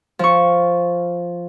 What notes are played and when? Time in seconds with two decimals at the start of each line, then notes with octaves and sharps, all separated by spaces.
0.19 F3 C#6